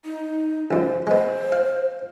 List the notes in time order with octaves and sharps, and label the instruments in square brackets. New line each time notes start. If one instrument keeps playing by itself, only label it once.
[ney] D#4
[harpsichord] C#2 F#2 [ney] C5
[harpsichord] G#3 B3 [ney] C5
[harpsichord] F5